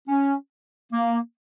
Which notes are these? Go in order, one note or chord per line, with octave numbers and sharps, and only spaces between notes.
C#4
A#3